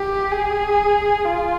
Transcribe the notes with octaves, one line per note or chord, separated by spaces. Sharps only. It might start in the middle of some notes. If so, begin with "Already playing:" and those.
Already playing: G4
G#4
F4